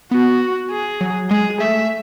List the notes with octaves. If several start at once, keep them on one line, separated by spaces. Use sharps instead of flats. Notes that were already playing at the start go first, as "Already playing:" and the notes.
B3 F#4
G#4
F#3
G#3 G#4
A3 E5